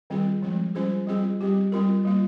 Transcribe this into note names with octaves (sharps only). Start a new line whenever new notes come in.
D#3 G3 C4 F4 G#4
F3 G#3 C4
G3 C#4 F4 G#4 C5
G3 C4 F4 G#4 D#5
G3 C4 G4
G3 C4 F4 A#4
G3 A#3 F4